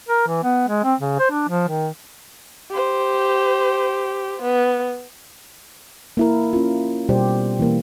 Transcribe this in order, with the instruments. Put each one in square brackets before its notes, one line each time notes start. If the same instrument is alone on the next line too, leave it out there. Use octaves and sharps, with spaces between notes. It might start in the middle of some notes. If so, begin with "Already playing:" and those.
[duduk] A#4
E3
B3
G#3
C4
C#3
C5
D4
F3
D#3
[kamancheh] G4 C5
B3
[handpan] A#3 E4 A#4
C#4 F4
B2 G3 G4 C5 D5
E3 A#3